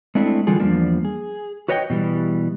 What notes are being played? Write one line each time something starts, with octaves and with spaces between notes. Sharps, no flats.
G#3 A3 C4 D4 E4
D3 E3 G3 F4 G#4
E2 B2 F3 G3 A#3 D4
G#4
F#4 B4 C#5 D#5 F#5 G5
B2 E3 G3